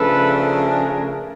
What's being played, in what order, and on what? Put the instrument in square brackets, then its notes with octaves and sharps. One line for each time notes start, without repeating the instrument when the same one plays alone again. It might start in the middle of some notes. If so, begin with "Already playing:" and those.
Already playing: [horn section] C#3 F3 A3 D4 A4 B4
G#4 A#4